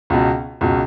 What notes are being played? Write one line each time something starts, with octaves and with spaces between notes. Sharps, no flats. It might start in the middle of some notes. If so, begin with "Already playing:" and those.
C#2 B2
C#2 B2